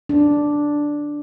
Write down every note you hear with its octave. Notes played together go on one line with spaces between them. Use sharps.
D4